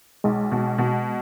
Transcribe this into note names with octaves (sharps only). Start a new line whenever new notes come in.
B1 G#3
B2
B2